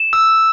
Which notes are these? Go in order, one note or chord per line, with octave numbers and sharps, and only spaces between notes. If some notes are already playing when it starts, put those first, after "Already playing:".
Already playing: E7
E6